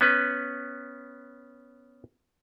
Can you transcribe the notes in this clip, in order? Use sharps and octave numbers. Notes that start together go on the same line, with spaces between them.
B3 C#4 B4